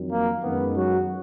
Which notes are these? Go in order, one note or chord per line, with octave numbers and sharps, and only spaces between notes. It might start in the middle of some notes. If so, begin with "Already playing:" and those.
Already playing: F2 D#3 F#3
A#3
F#2 D#3 G#3 B3
F#3 F#4